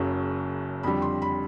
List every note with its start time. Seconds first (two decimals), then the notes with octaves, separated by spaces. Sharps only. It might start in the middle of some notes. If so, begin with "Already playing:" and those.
Already playing: F#1 F#2 C#3 F#3
0.83 F2 D3 G3 B5
1.02 C6
1.22 B5